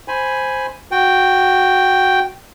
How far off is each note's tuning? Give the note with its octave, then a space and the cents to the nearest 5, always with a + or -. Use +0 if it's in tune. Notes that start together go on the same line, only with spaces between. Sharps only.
C5 +0 G#5 +0 B5 +0
F#4 -10 G5 +0